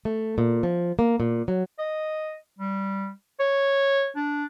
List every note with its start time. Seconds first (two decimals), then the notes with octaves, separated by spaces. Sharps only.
0.05 A3
0.38 A#2
0.63 F3
0.99 A#3
1.20 A#2
1.48 F#3
1.78 D#5
2.59 G3
3.40 C#5
4.16 D4